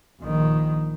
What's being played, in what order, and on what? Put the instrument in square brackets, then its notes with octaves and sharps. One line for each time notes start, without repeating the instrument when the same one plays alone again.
[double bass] A#1 D#3